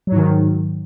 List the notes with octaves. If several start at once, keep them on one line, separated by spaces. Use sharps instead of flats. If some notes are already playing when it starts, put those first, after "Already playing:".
G#2 D#3 F#3